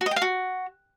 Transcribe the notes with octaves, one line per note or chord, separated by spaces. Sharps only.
F#4
D#5
G5
F5
F#4